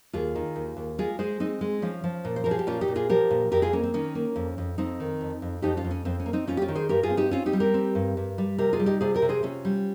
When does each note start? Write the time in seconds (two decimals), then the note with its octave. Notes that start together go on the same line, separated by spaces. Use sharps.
0.13 D#2 F4 G#4
0.36 D#3
0.56 D#2
0.77 D#2
0.99 G#3 F4 G#4
1.19 G#3 G#4 C5
1.40 G#3 C4 D#4
1.61 G#3
1.82 F3 C#4
2.04 F3
2.25 A#2
2.36 C5
2.44 F3 A#4
2.51 G#4
2.59 G4
2.67 A#2 C#4 F4
2.81 D#4 G4
2.88 A#2
2.95 F4 G#4
3.09 F3 G4 A#4
3.31 A#2
3.52 F2 G4 A#4
3.62 F4 G#4
3.73 A#3 C#4
3.84 C4
3.94 D#3 C#4
4.15 A#3
4.36 F2
4.58 F2
4.78 F2 C4 D#4
5.00 D#3
5.21 F2
5.42 F2
5.62 F2 D#4 G4
5.77 C#4 F4
5.84 F2
5.91 C#4
6.05 F2 C4
6.20 C#4
6.26 A#3
6.33 C4 D#4
6.47 F2 C#4 F4
6.57 G4
6.62 C#4 F4
6.68 D#3
6.75 G#4 C5
6.89 G2 G4 A#4
7.03 F4 G#4
7.10 C4
7.17 D#4 G4
7.31 C4 C#4 F4
7.46 D#4 G4
7.53 G3
7.60 G4 A#4
7.74 C4
7.95 G2
8.17 G2
8.38 G3
8.58 C3 G4 A#4
8.73 F4 G#4
8.79 G3
8.86 D#4 G4
9.01 C3 F4 G#4
9.14 G4 A#4
9.22 C3
9.29 G#4 C5
9.43 C3 C#4 F4
9.65 G3